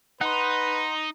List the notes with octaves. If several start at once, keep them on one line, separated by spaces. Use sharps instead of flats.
D#4 B4 F#5 C6